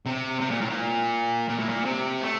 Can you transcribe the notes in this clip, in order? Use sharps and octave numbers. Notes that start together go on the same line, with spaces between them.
C3
C3
A#2
A2
A#2
A#2
A2
A#2
C3
A3